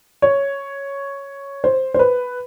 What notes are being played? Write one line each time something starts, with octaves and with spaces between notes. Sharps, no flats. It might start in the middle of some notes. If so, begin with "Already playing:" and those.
C#5
C5
C5
B4